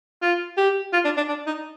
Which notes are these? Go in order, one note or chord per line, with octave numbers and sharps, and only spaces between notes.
F4
G4
F4
D4
D4
D4
D#4